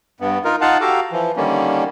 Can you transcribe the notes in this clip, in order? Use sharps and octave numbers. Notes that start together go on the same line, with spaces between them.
G2 B3
D#4 F4 A#4
D#4 F4 F5 F#5 A5
F#4 G4 A4 F5 A#5 D6
E3 F3
D3 D#3 G3 A#3 C#4